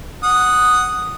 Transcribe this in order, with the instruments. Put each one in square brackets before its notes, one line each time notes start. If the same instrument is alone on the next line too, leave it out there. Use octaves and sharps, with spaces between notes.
[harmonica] F#5 D#6